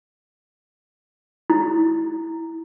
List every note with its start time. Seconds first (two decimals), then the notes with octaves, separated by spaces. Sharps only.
1.50 E4